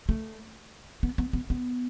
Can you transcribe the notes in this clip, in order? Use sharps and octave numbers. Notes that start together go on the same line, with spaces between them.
A3
B3
B3
B3
B3